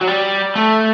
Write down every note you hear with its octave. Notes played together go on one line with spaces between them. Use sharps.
F#3
G3
A3